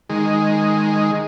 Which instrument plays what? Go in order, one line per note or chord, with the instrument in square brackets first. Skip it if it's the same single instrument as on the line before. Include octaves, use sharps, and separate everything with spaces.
[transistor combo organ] D#3 G#3